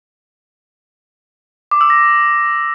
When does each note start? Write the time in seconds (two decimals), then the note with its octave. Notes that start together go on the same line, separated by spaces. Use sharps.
1.71 D6
1.81 E6
1.90 A#6